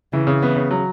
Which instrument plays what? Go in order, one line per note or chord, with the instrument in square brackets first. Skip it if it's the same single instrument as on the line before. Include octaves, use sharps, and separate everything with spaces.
[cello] C#3 [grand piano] E3
[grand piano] C#3
[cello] E3 [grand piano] B3
[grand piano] C#3
F#3